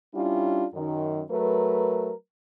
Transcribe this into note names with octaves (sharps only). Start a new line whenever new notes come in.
G3 C#4 D4 E4 F4
F#2 D#3
F#3 A3 A#4 B4